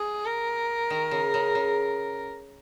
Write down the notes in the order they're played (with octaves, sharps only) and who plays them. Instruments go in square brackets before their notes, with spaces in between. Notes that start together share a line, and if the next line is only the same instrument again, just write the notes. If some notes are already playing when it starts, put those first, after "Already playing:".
Already playing: [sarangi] G#4
A#4
[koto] D#3
C#3
C#3
C#3